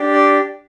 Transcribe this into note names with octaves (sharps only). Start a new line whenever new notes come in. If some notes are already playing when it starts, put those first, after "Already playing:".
Already playing: D4 G4
D5